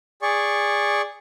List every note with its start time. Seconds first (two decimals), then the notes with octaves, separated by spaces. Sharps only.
0.22 G#4 D5 C#6